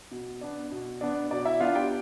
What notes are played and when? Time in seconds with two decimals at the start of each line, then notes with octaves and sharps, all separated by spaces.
0.11 B2
0.41 B3 D4
0.72 B2
1.01 B3 D4
1.31 B2 D5
1.45 E4 E5
1.60 B3 D4 F4 F5
1.75 G4 G5